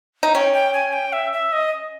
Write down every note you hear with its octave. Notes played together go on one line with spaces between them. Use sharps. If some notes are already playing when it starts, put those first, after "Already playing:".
D#4
C#4 G5
G5
G#5
G5
E5
E5
D#5